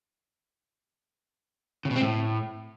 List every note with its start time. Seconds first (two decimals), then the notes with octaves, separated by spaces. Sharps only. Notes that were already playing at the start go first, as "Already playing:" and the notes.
1.85 C#3
1.90 B2
1.96 C4
2.01 A2